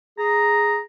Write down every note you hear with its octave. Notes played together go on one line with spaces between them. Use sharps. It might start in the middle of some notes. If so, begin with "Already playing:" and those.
G#4 A#5